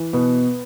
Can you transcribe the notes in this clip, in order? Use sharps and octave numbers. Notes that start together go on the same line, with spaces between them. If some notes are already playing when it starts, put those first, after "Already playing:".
Already playing: E3
B2 B3